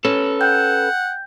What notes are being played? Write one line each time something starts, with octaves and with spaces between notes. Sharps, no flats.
C#4 A4 B4
F#5 G5 G6